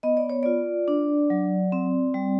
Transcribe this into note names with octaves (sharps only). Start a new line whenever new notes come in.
B3 D#5
D5
C#5
F4 D5
D4
F#3
C4
G3